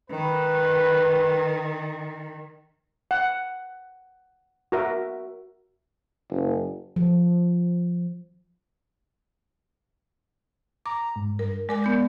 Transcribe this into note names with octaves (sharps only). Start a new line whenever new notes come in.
D#3 B4
F#5
F#4 A#4 E5
F#1
F3
A#5 D6
G#2
G2 A#4
G#3 A#4 D5 G#5
B3 G6